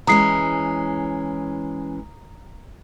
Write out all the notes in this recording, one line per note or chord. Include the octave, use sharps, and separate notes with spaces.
E3 G#3 C#4 A#5 D#6 C7